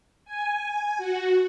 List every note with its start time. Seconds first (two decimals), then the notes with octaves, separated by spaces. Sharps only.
0.25 G#5
0.98 F#4